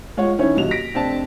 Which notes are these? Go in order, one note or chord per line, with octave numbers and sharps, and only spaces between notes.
G#3 F4 C#5 F#5
D2 D#3 C#4 E4 C#5
D#1 B1 F#4 F7
A#6 B6 D7
F1 C4 D4 A5